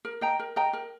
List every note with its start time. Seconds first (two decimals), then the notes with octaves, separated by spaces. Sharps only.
0.05 A#4
0.21 D#5 G5 A#5
0.39 A#4
0.56 D#5 G5 A#5
0.73 A#4